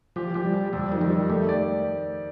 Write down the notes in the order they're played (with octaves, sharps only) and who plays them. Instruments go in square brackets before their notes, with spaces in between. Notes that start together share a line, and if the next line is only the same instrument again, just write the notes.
[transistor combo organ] F3 [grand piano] G4
[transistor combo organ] F3 [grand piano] G4
[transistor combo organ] G3
[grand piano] G4
[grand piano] F2 [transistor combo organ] G3
[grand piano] D#3 [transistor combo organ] F3
[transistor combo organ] G3
[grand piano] D#3
[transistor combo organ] A3 [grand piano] G4
[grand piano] D5